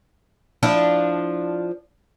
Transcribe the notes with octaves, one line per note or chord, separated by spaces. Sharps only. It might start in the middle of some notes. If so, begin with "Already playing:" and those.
F3 D4 E4